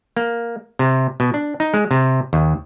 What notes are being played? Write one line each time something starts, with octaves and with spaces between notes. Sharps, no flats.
A#3
C3
B2
D4
D#4
G#3
C3
D#2